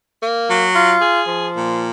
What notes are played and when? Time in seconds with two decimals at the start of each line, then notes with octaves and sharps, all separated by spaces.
0.22 A#3
0.48 F#3
0.74 F4
1.01 G#4
1.27 F3
1.54 A#2